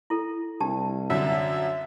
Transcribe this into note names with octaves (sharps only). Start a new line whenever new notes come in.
E4 A4
C2 D4 G4 A5
F#2 D3 E5